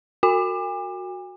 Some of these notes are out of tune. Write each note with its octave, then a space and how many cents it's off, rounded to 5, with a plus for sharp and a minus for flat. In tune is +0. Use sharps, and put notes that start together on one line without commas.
F#4 -10 G#5 -45